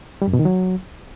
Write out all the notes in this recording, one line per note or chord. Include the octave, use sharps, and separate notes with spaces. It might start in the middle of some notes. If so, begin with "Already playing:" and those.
G3
F#2
B2
D#3
F#3